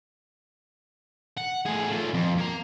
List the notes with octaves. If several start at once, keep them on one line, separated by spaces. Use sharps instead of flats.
F#5
A2 G#4
A3 F4
F2
A#3 A#5